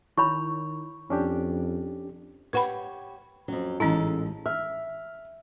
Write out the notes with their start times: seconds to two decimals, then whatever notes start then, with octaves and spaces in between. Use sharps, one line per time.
0.18 D#3 E4 C#5 B5 C#6
1.10 F2 C#4 D4 G4
2.53 G4 B4 C#5 F#5 B5
3.48 F2 F#3 C#4
3.80 A1 G#2 G#3 C#4 E4 A4 A#5
4.46 E5 F6